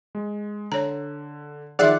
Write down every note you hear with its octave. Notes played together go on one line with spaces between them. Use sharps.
G#3
D3 C#5 A#5
D#3 F3 G#4 D5 E5 F#5 C6